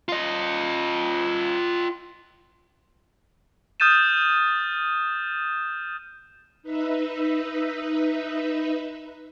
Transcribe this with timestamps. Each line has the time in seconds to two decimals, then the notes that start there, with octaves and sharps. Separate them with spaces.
0.09 F4 D#5
3.80 D#6 F6 G6 A6 D#7 E7
6.63 D#4 B4 E5